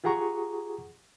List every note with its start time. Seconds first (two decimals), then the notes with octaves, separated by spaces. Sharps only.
0.04 F4 G4 G#4 F#5 A#5 C#6